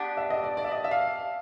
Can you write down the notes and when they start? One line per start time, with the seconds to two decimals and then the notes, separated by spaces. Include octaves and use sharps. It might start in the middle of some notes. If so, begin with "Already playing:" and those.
Already playing: B3 D4 G4
0.17 E5
0.30 D#5
0.44 D5
0.57 D5
0.64 E5
0.71 D#5
0.84 E5
0.91 F5